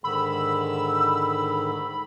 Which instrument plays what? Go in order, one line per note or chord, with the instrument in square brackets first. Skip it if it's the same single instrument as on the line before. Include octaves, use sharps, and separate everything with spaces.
[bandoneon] G#2 D3 D#3 [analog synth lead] B5 [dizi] E6